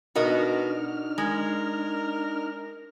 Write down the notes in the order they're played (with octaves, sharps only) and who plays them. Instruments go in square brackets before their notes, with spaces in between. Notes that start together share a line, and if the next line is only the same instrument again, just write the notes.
[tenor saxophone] B2 [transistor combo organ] D4 D#4 F6 [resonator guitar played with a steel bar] F#4 A#4 D#5
[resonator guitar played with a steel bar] G#3 [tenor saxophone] A#4